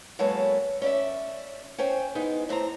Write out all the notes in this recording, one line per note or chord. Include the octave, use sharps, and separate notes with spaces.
F#3 G#3 A#3 B3 A4 C#5
C#4 D5 E5
C#4 C5 G5 G#5
E3 G#3 B3 D#4
A2 C4 C5 A#5